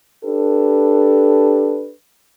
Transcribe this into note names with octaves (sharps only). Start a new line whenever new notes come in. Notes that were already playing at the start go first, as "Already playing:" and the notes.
D4 G4 A4 B4